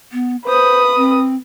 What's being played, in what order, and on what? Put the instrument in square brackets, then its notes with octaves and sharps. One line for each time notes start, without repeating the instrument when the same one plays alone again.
[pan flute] B3
[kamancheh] B4 D#6 [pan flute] C5
[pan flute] C4